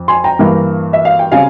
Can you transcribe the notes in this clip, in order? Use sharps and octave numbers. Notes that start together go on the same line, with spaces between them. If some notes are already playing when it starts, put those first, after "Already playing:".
Already playing: F2
G#5 C6
G5 A#5
G2 E3 A#3
E5
F5
G5
C#3 G3 C4 F5 G#5